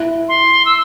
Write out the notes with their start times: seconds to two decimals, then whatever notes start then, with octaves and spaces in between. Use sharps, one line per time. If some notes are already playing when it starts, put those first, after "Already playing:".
Already playing: E4
0.29 C6
0.65 E6